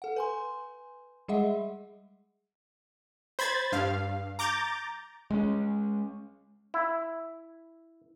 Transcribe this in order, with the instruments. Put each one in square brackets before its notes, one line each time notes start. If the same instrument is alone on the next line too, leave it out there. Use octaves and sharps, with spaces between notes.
[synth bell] A4 F#5
B4 G#5 C6
G3 G#3 G#4 D#5 E5 F#5
[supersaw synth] C5 B5 G#6 A6
G2 F5
A#5 D6 G6 A6
[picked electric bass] G#3 A#3 C#4
[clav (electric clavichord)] E4